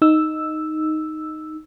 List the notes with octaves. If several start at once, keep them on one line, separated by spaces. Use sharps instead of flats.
D#4 E6